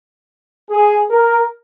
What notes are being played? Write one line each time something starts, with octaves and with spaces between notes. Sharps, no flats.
G#4
A#4